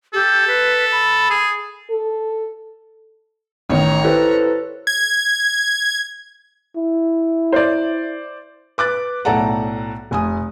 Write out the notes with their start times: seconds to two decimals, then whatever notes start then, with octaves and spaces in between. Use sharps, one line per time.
0.14 G4 A4
0.47 B4
0.91 B5
1.30 G#4
1.90 A4
3.69 A1 D#3 C#5 A#5
4.04 E4 G4 A4 B4 C5
4.87 G#6
6.76 E4
7.52 C5 D5
8.78 B4 D6 F#6 A6
9.25 B1 A2 A4 D5 F#5 A#5
10.11 F1 G#5 D#6